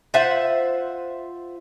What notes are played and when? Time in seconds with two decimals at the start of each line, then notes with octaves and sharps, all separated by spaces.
0.14 F4 C5 E5 F#5